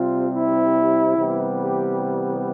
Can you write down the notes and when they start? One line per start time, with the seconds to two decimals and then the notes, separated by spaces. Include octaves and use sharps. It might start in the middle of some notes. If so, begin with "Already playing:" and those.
Already playing: C3 G3 C4 F4
0.33 E4
1.18 C3 E3 G3 B3
1.61 G4